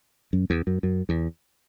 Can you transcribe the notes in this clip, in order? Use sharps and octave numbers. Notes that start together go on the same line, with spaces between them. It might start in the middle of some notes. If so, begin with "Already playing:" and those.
F#2
E2
F#2
F#2
E2